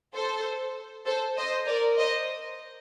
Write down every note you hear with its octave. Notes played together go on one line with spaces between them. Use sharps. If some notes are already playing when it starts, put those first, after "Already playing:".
A4 C5
A4 C5
C5 D#5
A#4 D5
C5 D#5